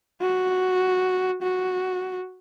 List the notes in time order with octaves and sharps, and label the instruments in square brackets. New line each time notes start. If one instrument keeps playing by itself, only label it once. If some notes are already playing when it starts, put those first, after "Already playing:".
[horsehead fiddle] F#4
F#4